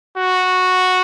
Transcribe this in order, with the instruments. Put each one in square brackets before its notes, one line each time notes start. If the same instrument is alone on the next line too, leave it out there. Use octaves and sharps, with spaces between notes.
[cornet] F#4